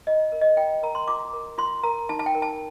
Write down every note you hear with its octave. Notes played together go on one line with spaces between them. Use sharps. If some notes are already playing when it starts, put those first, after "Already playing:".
F4 D#5
A#4
D#5
F4 G5
A#4 A#5
C6
F4 D6
A#4
F4 C6
A#4 A#5
D#4 A5
A5
G5
A#4
A5